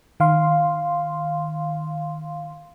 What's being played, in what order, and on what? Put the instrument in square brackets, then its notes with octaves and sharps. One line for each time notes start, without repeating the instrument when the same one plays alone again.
[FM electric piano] D#3 F5 C6